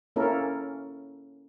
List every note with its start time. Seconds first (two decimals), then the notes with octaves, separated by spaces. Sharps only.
0.16 A#3 C#4 E4 A4 A#4